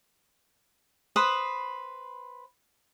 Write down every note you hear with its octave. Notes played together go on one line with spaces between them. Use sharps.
B4 C5 B5 D#6